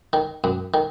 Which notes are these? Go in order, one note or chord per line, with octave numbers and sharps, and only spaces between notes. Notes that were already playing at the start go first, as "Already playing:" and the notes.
D#3
F#2
D#3